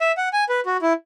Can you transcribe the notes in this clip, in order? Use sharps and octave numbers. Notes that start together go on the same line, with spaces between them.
E5
F#5
G#5
B4
F#4
E4